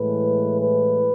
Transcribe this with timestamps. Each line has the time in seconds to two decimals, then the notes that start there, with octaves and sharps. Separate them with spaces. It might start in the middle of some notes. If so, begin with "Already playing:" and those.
Already playing: A2 E3 G#3 B4
0.58 B4